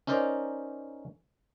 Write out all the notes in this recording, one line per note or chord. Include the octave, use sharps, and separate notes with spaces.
C#4 D#4 A#4 C5 D5